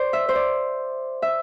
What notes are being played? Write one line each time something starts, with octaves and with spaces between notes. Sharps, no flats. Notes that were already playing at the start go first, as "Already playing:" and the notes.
Already playing: C5 D5
E5
C5
D5
E5